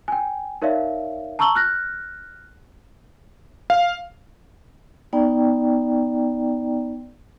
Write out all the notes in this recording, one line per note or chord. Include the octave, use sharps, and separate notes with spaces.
G5 G#5
D#4 A#4 C#5 D5 E5 F5
A5 A#5 C#6 E6 F#7 G7
F6 F#6 A#6
F5
B3 D#4 D5 G5 A#5